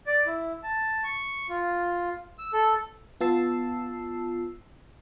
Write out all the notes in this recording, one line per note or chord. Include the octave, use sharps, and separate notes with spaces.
D5
E4
A5
C#6
F4
E6
A4
B3 F4 A5 E6 C7